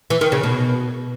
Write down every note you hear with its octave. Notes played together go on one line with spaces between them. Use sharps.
E3
D#3
C#3
B2